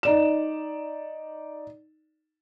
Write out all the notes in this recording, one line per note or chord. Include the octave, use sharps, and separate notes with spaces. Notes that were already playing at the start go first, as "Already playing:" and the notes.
D#4 D5 E7